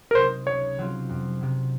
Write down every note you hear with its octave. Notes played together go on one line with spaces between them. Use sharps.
A#4
C3 F#3 C4 D#4 C5
C#2 C#5
C3 F#3 C4 F4
F2
C3 F#3